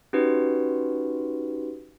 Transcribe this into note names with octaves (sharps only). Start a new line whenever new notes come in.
C#4 D#4 F#4 G4 B4